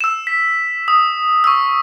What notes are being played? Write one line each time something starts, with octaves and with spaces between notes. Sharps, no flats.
E6 E7
B6
D#6
C#6 E6